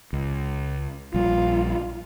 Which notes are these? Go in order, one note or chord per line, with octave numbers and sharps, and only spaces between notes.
C#2
A#1 G3 F4